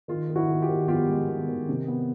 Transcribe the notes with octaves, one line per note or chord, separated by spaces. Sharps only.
D#3 F4
D#3
E4 F#4
D#3
F4 G4
D#3
B3 F4 G4
G#3
D#3
D#3
C3
B3